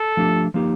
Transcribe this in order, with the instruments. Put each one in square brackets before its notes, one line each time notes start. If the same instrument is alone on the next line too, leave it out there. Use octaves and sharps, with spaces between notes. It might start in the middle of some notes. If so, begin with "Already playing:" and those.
Already playing: [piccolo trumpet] A4
[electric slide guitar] F3 A3 D4 G4
F3 A#3 D#4 G4